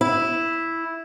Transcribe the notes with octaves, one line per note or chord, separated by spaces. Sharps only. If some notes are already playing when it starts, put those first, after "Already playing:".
E4